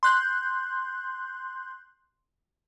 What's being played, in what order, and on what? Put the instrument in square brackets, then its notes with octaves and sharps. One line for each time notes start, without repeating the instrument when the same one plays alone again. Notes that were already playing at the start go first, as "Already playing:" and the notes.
[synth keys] C6 F#6 G6